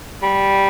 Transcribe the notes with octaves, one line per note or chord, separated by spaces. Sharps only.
G3